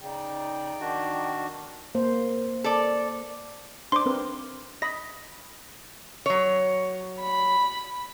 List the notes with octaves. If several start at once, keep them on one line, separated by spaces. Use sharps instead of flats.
C#3 D#4 D5 G5
D#3 D4 F#4
A#3 C5
A4 D5
D4 C5 C6 D6
C4 A#4 B4
D#5 B5 A#6
F#3 C#5
B5